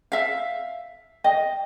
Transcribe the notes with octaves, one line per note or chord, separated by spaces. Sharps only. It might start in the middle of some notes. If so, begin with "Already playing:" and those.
E5 F5
D#5 G5